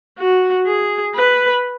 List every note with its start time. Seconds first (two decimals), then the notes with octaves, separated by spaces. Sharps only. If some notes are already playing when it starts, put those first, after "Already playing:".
0.19 F#4
0.66 G#4
1.15 B4